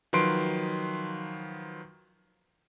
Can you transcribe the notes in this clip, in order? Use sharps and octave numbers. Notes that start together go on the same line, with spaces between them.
D#3 F3 F#3 B4 C6 D7